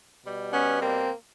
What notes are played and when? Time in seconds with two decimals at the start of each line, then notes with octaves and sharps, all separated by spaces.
0.23 B2 G3
0.52 B3 C#4
0.81 A#3 C4